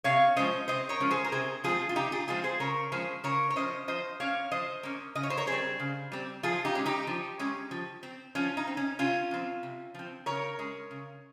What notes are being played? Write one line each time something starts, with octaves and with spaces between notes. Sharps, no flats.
C3 C#5 F5
F3 G#3 C#4 C5 D#5
C3 C5 D#5
A#4 C#5
F3 G#3 C#4
G#4 C5
A#4
C3 G#4 C5
F3 G#3 C4 F4 G#4
F4
C3 D#4 G4
F4 G#4
F3 G#3 C4 F4 G#4
G#4 C5
C#3 A#4 C#5
F3 G#3 C#4 G#4 C5
C#3 A#4 C#5
C#5
F3 G#3 C#4 C5 D#5
F3 C5 D#5
A#3 C#4 C#5 F5
F3 C5 D#5
A#3 C#4
C#3 D#5
C#5
C5
A#4 C#5
G3 C4 G#4 C5
C#3
G3 C4
F3 F4 G#4
D#4 G4
G#3 C#4
D#4 G4
F3
G#3 C#4
F3
C4
F3 C#4 F4
D#4
C4
C#4
C3 C#4 F4
F3 C4
C3
F3 C4
C#3 A#4 C#5
G#3 C#4
C#3